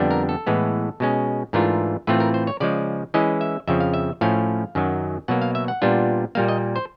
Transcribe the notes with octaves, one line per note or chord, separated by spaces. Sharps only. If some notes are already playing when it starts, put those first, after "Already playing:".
Already playing: F2 D3 G3 B3 D4
A#4
A4
A2 E3 G#3 B3
B2 G#3 C#4
G#2 E3 A3 D4 F4 A#4
A2 E3 A3 C4 F4 B4
A#4
C5
C#5
C#3 F3 G#3 D5
E3 G#3 C#4 E4 D#5
E5
F2 C#3 F3 E5
F5
E5
A2 F3 A3 C#4 F5
F#2 D#3 F#3
B2 F#3 A#3 F#5
F5
E5
F#5
A#2 G3 B3 D4 F4
A#2 G3 A#3 F5
D#5
C5